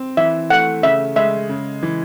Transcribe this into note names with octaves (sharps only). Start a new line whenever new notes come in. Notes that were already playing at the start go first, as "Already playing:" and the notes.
Already playing: C4
E3 E5
A3 F#5
C#3 E5
G#3 E5
C#3
E3